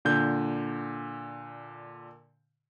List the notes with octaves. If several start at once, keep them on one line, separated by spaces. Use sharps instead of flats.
A#2 D3 G6